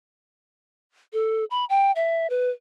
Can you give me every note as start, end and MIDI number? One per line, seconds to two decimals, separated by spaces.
1.13 1.45 69
1.51 1.65 83
1.70 1.92 79
1.96 2.30 76
2.30 2.50 71